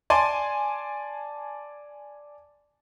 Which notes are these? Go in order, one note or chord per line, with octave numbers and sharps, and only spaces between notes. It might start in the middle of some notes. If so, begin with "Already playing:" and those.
D5 G#5 A5 C6